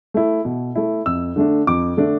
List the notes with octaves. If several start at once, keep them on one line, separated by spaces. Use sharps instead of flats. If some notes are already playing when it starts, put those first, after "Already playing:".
A3 E4
B2
A3 E4
F2 E6
D3 A3 D4
F2 D6
D3 A3 D4